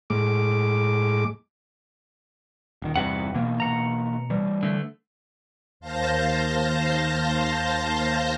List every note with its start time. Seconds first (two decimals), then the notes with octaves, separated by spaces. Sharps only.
0.10 A2 G#3 D6
2.82 D#1 D#3
2.96 E2 G2 C3 B4 F#5
3.34 B2 E3 A#3 B3
3.60 B2 F#5 A#5
4.30 E3 G3
4.63 D3 A3
5.80 D#2 C5 F5 A5 G6 A#6